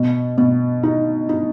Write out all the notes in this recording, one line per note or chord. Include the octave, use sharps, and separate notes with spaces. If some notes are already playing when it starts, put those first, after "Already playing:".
Already playing: B2
B2
D#4
D#4